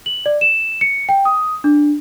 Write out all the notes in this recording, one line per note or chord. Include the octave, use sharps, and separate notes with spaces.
F#7
D5
E7
C#7
G5
D#6
D4